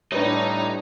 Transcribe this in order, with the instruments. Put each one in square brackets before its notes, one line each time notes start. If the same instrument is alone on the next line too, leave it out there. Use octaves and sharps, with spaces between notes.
[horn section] A2 G3 [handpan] D4 B4 C#5 [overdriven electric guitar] D#4 D#5